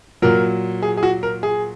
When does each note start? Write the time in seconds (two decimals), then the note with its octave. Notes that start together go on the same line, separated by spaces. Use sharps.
0.22 A#2 F#3 A#4
0.82 G#4
0.97 G#4
1.03 F#4
1.23 A#4
1.43 G#4